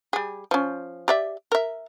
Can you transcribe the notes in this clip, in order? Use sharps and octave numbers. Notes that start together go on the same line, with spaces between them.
G3 G#4
F3 C#4
G4 D5 E5
A#4 E5